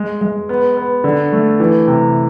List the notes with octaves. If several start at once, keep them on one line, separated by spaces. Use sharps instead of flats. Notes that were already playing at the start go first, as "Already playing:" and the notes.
Already playing: G#3
G#3
B3
B3
D3
A3
E3
C3